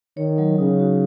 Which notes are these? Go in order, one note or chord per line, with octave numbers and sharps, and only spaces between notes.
D#3 C#5
F#3
C#3 D#4
F#4